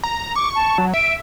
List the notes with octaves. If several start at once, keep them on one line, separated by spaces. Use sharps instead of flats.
A#5
C#6 D6
A5
F#3
E5 D7